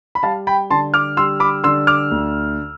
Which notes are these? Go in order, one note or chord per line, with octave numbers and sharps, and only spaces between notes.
B5
G3 F5 A5
G5 B5
D3 A5 C6
D6 F6
G3 C6 E6
B5 D6
D3 C6 E6
D6 F6
D2